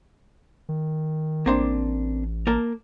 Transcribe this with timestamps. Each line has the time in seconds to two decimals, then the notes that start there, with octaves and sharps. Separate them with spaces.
0.69 D#3
1.46 A1 A#3 C4 D4
2.47 A#3 A#4 A5